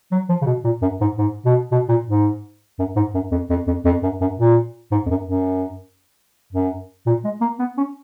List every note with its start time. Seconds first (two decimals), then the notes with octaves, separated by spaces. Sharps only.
0.12 F#3
0.29 F3
0.42 C#3
0.46 B2
0.64 A#2
0.82 F#2
1.01 G#2
1.18 G#2
1.46 B2
1.72 B2
1.89 A#2
2.07 G#2
2.79 F#2
2.96 G#2
3.14 F#2
3.32 F2
3.50 F2
3.67 F2
3.85 F2
4.03 F#2
4.21 F#2
4.39 A#2
4.92 G#2
5.06 F2
5.10 F#2
5.28 F#2
6.53 F#2
7.07 A#2
7.24 G#3
7.41 A#3
7.59 B3
7.77 C#4